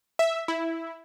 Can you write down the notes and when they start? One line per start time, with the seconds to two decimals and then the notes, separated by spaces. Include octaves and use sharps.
0.19 E5
0.48 E4